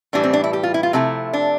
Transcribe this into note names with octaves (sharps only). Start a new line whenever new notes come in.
A2 E3 G3 D4
C4
D4
E4
G4
F4
E4
F4
C3 F3 A3 E4
D4